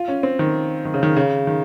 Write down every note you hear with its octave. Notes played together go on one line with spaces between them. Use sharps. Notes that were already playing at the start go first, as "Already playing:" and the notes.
Already playing: F4
C#4
C4
D#3
D#3
C#3
D#3
C#3
D#3